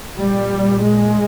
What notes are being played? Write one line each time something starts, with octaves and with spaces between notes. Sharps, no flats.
A#2 G3
G#3